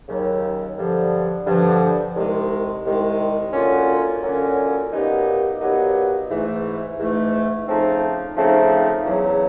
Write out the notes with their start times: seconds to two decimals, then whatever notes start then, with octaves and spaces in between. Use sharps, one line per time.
0.08 D#2 C#3 F#3
0.77 G2 D3 F3
1.45 G2 D3 F3
2.15 C2 C3 D#3 G#3
2.85 C2 C3 D#3 G#3
3.53 D3 F#3 A#3 C#4 F4
4.22 D3 F#3 A#3 C#4 F4
4.91 A#2 F#3 B3 D#4 G4
5.61 A#2 F#3 B3 D#4 G4
6.30 G#2 E3 A3
6.98 G#2 E3 A3
7.68 C#3 F3 A3 C4 D#4
8.37 C#3 F3 A3 C4 D#4
9.05 E2 C#3 F#3